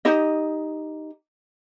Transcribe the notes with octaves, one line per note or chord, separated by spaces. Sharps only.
D#4 G4 D#5